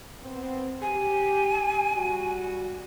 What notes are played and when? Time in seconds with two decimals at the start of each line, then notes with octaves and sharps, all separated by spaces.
0.21 B3 C4
0.82 G4 G#5
1.93 G3 F#4